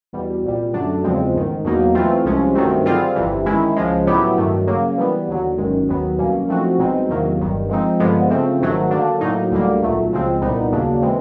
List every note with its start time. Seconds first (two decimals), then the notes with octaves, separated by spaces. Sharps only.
0.13 E2 B2 G3
0.43 C2 A#2 G3
0.73 F#2 D3 F#3 A3 D4
1.04 E2 C#3 F3 G#3 C4
1.34 A1 G#2 D#3
1.64 E2 B2 F#3 A#3 D#4
1.95 E3 A3 C4 F4
2.25 C2 C3 F3 G#3 C#4
2.55 G2 D#3 F#3 A3 C4
2.85 D3 G3 C4 F4 G#4
3.16 G1 F2 C3 E3
3.46 D#3 G#3 C#4 E4
3.76 C#2 C#3 F3 G#3
4.07 A2 F#3 B3 E4 G4
4.37 G2 D#3 F#3 A3
4.67 C#3 F#3 A#3
4.98 E3 G3 B3
5.27 D#2 D3 F#3
5.58 G1 F#2 D#3 G#3
5.88 D#2 D#3 F#3 B3
6.18 C2 B2 F#3 A#3 C#4
6.48 F3 A3 C4 D#4 F#4
6.79 C2 B2 G#3 C4 D#4
7.09 E2 C3 D#3 F#3 A#3
7.39 G1 G2 D#3
7.69 F3 G#3 C4 D#4
8.00 G2 D3 F3 G#3 B3
8.30 C#3 F3 A3 C4
8.60 G#1 G#2 D#3 F#3 A3
8.90 D3 F#3 A#3 D4
9.21 A2 F#3 A#3 D#4
9.51 D2 D3 G3 A#3
9.81 B1 A#2 F#3 A3
10.12 C#2 C#3 F3 G#3 C4
10.42 C2 A#2 G3 B3 D#4
10.72 D#2 C#3 F#3 A#3 D4
11.02 E3 G#3 C4